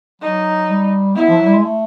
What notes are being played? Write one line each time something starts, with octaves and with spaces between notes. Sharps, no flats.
F#3 D#4
G3
B3 E4
F3
F#3
G3
G#3
A3